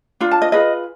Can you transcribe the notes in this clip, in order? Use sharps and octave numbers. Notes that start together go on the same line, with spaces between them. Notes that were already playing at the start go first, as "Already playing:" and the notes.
D4 F4
A5
D#5
F4 G#4 B4 D#5